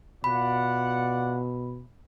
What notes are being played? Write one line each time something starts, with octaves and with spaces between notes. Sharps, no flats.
B2 F4 D5 F#5 B5